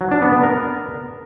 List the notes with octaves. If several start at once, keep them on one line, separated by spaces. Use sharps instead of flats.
F#3
D4
B3
B3
A#4